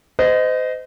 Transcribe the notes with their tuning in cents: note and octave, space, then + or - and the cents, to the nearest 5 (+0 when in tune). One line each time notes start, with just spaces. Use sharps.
C5 -35 D#5 +0